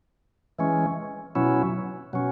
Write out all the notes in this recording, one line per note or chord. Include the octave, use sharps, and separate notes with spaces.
E3 G#3 C#4
B2 F#3 C#4 E4
B2 F#3 C#4